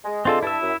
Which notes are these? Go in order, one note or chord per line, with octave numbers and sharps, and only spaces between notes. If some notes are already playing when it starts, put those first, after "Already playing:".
G#3
D3 G#3 C4 F4 A4
G2 E4 E5 A5
F#2